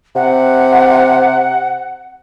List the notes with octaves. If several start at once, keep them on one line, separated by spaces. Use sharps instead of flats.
C3 F#5